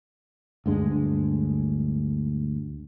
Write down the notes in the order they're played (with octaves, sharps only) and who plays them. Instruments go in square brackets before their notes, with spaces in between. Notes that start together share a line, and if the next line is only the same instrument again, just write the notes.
[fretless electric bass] D2 G2 G#3 D4